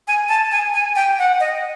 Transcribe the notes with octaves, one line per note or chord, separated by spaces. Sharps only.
G#5
A5
G#5
G#5
G5
F#5
D#5